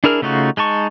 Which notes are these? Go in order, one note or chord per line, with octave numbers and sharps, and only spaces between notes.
D4 E4 G#4 A#4 F6
C#3 A3 D#4 F4 F#4
G#3 D#4 A5 C#6